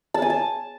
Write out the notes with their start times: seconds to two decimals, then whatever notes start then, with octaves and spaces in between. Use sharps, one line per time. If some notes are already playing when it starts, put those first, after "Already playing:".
0.14 A5
0.22 G#5
0.30 A5